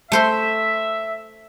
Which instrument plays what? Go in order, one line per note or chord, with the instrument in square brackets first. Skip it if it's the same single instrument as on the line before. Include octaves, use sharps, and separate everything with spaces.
[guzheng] A3 C5 C6 [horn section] E5